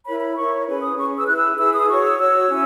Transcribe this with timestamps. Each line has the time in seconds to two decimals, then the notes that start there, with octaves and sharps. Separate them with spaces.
0.05 E4 A#4 C#5 B5
0.20 B5
0.36 E4 A#4 C#5 C#6
0.66 C#4 G#4 B4
0.82 D#6
0.96 C#4 G#4 B4 C#6
1.18 E6
1.27 E4 G#4 B4 F#6
1.38 E6
1.57 E4 G#4 B4 E6
1.73 D#6
1.88 F#4 C#5 C#6
2.03 E6
2.18 F#4 C#5 E6
2.49 C#4 E4